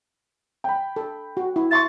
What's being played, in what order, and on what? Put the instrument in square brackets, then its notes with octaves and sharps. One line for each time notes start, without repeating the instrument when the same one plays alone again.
[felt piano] G5 B5
[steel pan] A4
F#4
E4
[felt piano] E5 C6 C#6 [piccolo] A6